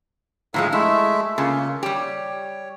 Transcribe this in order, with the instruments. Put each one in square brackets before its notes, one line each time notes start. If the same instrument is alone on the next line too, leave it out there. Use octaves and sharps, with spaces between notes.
[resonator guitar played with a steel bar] A2 F3 G#3 [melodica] A4 F5 A#5
[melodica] G#3 A3 E5 [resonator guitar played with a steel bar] E4
[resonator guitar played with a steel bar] C#3 [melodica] A#3 F4 A4
[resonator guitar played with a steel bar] G3 G4 [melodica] C#5